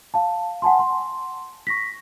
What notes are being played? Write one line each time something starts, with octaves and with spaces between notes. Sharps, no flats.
F5 A5
F#5 G#5 A5 C6
C6
C#6 A#6 B6